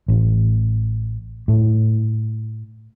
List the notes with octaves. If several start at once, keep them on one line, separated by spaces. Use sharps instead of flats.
A1
A2